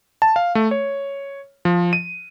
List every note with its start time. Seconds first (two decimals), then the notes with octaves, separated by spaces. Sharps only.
0.22 A5
0.36 F5
0.55 A3
0.71 C#5
1.65 F3
1.93 D#7